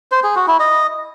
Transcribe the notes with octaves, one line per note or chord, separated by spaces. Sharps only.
C5
G#4
F#4
E4
D#5